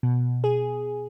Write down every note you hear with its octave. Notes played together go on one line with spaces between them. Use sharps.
B2
G#4